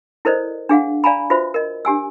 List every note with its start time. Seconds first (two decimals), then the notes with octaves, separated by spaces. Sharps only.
0.25 E4 A4 A#4 C5 D5 D#5
0.69 D4 G#4 F5 F#5
1.04 D5 F5 G#5 A#5 B5
1.30 F4 F#4 B4 C5 E5
1.54 A#4 D#5
1.85 D4 G4 G#5 E6